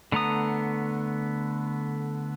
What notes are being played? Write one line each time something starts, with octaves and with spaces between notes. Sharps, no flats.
D3 A3 B3 A#5 D#6